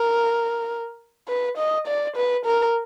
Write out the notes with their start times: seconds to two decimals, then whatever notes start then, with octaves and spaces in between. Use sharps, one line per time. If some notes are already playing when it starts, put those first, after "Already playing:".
Already playing: A#4
1.28 B4
1.58 D#5
1.87 D5
2.16 B4
2.45 A#4